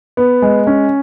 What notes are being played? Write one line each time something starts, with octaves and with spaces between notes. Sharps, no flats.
B3
G#3
C#4